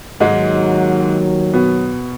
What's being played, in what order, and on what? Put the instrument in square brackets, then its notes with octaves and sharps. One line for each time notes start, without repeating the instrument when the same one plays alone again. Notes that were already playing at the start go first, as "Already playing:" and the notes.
[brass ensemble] D#2 D#3 F#3 [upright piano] G#2 G#3
[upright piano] B2 B3